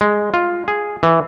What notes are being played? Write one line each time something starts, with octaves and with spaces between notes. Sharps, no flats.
G#3
F4
G#4
E3